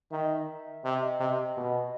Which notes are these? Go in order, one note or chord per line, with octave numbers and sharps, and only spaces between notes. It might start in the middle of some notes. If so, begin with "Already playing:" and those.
D#3 E5
D#5
E5
C3 D#5
E5
D#5
C3
B2